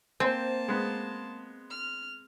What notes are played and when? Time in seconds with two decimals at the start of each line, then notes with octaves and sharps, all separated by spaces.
0.20 A#3 C4 C5 G#5 A5
0.68 G#3 B3
1.69 F6